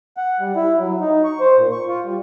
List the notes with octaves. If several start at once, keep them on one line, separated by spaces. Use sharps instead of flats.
F#5
G3
E4
F#3
D#4
C#6
C5
A#2
C#6
F4
G3